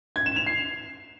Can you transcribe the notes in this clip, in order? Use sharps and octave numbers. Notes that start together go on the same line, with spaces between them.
G#6
E7
F7
C7